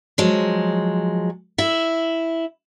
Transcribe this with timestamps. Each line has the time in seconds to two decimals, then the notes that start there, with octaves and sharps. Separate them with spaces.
0.18 F3 F#3 G#3
1.58 E4 E5